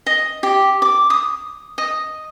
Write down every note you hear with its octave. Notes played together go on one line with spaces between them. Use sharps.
D#5
G4
D6
D#6
D#5